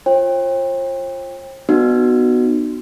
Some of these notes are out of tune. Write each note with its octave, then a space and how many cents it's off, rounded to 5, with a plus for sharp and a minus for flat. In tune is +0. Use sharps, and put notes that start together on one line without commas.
F4 +0 C5 +45 G5 +25
B3 +0 D#4 -40 F#4 +0